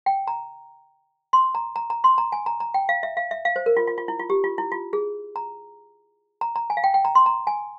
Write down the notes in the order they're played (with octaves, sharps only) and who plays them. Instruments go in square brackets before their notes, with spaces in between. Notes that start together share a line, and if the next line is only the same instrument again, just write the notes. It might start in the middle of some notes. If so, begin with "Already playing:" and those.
[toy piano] G5
A#5
C6
A#5
A#5
A#5
C6
A#5
G#5
A#5
A#5
G5
F5
E5
F5
E5
F5
C5
A#4
F4
F4
F4
E4
F4
G4
F4
E4
F4
G#4
A#5
A#5
A#5
G#5
F5
G5
G5
A#5
C6
A#5
G#5